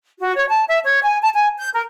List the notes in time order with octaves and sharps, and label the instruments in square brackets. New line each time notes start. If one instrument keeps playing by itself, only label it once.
[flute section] F#4
C#5
A5
E5
C#5
G#5
A5
G#5
G6
A#4